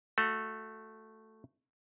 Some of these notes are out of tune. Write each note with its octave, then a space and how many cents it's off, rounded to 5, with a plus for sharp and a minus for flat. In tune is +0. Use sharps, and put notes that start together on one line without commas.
A3 +0 F#4 -20